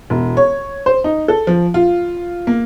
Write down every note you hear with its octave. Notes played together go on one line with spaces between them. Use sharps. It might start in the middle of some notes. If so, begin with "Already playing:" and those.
E1
C#5
C5
D#4
A4
F3
F4
A#3